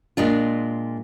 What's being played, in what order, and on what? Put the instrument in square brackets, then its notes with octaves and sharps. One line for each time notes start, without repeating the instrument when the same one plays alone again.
[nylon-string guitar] A#2 G#3 D4 F4